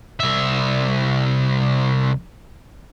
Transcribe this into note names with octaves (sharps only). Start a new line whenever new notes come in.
C2 E5